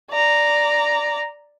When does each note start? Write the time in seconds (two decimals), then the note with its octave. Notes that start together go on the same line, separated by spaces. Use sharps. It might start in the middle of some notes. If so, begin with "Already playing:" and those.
0.11 D5 A#5